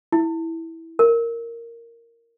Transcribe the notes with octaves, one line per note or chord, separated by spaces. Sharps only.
E4
A#4